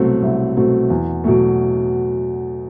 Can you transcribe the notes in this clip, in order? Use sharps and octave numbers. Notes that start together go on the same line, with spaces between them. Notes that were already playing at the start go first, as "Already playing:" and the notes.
Already playing: C2 B2 F#3 A3 C4
C2
B2 F#3 A3 C4
E2
B2 F#3 A3